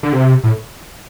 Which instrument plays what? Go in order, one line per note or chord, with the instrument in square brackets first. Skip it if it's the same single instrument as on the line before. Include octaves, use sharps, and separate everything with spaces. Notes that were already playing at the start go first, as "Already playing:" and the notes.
[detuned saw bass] D3
C3
A2